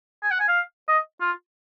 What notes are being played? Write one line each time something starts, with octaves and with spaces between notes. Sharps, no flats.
G#5
F#5
G#5
F5
D#5
F4